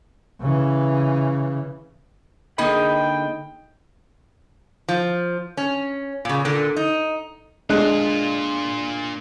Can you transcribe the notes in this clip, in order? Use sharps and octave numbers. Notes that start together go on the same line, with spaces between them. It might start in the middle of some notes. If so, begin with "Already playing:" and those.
C#3 E3
D3 A#3 D#4 G#4 D#5 G5 B5
F3
C#4
A#2 C#3
A#2 D3
D#4
A#2 G#3 D4 F4 F#6